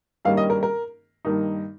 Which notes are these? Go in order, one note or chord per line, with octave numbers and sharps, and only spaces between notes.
G2 D#3 G3 A#3 C#4 F5
D#5
A#4
A#4
G2 D#3 A#3 D#4